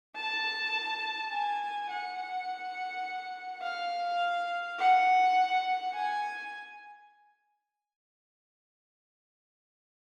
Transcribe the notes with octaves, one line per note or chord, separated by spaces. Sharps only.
A5
G#5
F#5
F5
F#5
G#5